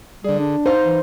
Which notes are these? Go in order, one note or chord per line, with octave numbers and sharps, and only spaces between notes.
D3 G3 G#4
D4
D#4 C5 F5
E3